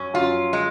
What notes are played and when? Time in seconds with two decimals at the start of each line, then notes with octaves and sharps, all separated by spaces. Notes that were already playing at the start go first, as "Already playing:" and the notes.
Already playing: F#2 C#4
0.14 F#2 F4
0.53 G#3